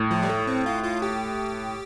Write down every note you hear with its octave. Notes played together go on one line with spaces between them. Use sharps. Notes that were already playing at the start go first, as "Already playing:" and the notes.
Already playing: A2
F3
G3
A3
C4
F4
F4
G4